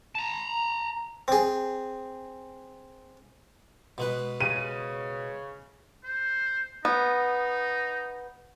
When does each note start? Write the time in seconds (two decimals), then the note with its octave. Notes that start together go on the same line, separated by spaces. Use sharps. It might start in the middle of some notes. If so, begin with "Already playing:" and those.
0.15 A5 A#5
1.28 C4 G#4
3.98 B2 G#3 B4
4.40 C#3 D#7
6.04 C5
6.85 B3 D#4